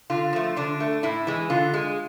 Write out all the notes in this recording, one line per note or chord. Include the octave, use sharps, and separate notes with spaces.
D3 F4
F3 A3
D3 D4
A3
A2 E4
E3 G#3
D3 F4
G#3